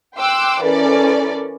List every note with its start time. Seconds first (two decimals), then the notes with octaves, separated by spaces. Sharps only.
0.16 G5 C6 D6 E6 F#6
0.63 E3 C#4 A4 A#4 D5